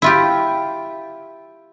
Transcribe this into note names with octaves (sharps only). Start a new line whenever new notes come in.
E4 F4 G4